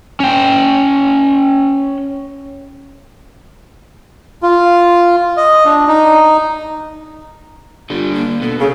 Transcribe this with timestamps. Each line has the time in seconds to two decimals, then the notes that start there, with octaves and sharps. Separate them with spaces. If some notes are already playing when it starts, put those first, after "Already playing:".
0.20 C#4 G5
4.43 F4
5.37 D#5
5.65 D4
5.88 D#4
7.90 D3 G3 F4
8.14 A#3
8.42 B2 A4
8.60 C#3 A4